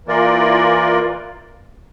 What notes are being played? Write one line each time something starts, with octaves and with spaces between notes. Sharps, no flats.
E3 A#3 F4 A#4 D5